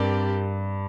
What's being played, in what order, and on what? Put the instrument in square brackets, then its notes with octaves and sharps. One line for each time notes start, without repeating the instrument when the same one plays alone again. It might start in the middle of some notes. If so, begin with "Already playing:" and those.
Already playing: [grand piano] G2 [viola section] C4 G4 A#4 D5